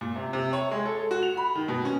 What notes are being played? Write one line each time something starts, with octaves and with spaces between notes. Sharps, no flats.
A#2
C3
C3
C#5
G#3
A4
F#4
F7
B5
D#3
B2
C#4